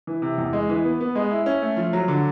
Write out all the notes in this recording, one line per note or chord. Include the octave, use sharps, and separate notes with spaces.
E3
C3
E2
G#3
E3
B3
B3
G#3
E4
C#4
A3
F3
F#3
D3